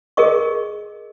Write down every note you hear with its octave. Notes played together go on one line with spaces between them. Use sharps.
G#4 A#4 D#5 C#6